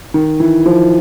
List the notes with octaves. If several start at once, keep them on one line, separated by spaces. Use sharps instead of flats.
D#3
E3
F3